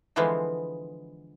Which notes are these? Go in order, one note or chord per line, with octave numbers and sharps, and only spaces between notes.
D3 E3 F3 G#3 B3 C4